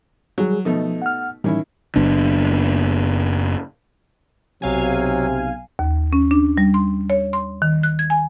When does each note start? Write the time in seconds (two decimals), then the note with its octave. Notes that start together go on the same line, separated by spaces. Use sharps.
0.38 F#3 G3 G#4
0.65 B2 F3 A3 D#4
1.02 F#5 F6
1.44 A2 D#3 E3 G3 C#4 E4
1.96 F#1 B3 D4
4.62 B1 C3 F#3 F5 G#5
5.79 D#2
6.13 C#4
6.31 D4
6.58 G3
6.74 C6
7.10 C#5
7.33 C6
7.62 D#3
7.83 F#6
7.99 G#6
8.10 G#5